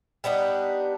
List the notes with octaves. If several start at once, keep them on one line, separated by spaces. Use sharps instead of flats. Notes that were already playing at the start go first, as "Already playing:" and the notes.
G3 B3 D4 D#4